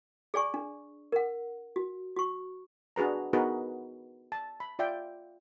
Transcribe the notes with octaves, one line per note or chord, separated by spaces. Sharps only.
G#4 D5 G#5 C#6
D4
A#4 F#5
F#4
F#4 C#6
D4 F#4 G#4 B4 A#5
B3 D#4 F#4 G#4 A#4 B4
A5
B5
F4 D5 E5 G5